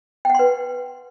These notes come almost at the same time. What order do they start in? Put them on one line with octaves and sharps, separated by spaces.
G5 F#5 C6 B4